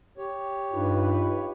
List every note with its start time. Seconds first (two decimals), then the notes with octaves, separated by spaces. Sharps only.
0.18 G4 C#5
0.73 G2 D#4 F4 B4